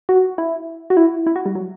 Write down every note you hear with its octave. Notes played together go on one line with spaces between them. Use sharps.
F#4
E4
F#4
E4
E4
F#4
G3
F#3